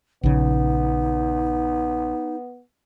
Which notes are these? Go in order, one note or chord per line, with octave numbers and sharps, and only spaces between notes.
A#1 C#3 B3 D#4